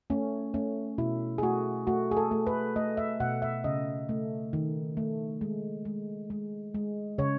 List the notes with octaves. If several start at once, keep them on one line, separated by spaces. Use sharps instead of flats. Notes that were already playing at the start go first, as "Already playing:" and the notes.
A3 C#4
A3 C#4
B2 E4
G#4
A3 F#4
A3 F#4
G#4
A4
A3
B4
A3 D#5
E5
B2 F#5
E5
C#3 D#5
A3
D#3
A3
G#3
G#3
G#3
G#3
C#3 C#5